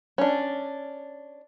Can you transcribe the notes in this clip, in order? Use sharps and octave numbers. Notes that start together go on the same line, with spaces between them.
C#4 D4